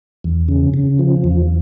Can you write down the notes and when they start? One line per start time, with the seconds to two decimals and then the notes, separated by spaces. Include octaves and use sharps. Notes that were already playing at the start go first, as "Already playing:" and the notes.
0.24 E2
0.48 C#3
0.74 C#3
0.99 F3
1.24 E2